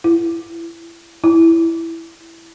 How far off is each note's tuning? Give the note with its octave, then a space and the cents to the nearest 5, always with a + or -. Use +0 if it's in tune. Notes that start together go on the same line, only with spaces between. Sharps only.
E4 +25
E4 +5